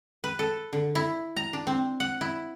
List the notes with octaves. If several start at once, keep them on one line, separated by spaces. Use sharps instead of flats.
B4
A4
D3
E4
A#5
D4
C4
F#5
E4